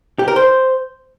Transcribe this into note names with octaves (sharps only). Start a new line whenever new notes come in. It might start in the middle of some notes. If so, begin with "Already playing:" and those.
G4
A#4
C5